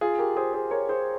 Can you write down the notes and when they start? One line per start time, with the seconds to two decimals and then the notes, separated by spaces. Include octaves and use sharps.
0.01 F4 G#4
0.19 G4 A#4
0.37 G#4 C5
0.54 G#4 C5
0.71 A#4 C#5
0.89 G#4 C5